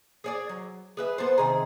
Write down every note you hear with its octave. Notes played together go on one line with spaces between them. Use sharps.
G#4 C#5 D5
F#3
G#4 B4 E5
B3 A4 C5
C3 D#3 G#4